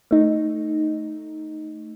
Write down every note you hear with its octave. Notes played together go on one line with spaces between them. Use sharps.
A3 D#4